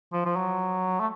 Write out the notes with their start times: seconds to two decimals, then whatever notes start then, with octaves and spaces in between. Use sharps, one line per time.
0.13 F3
0.26 F3
0.36 F#3
1.00 A3